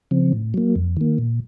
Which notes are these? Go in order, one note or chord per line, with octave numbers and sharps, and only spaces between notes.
C#3 F3 C4
A2
F#3 A#3
F2
D#3 A#3
A#2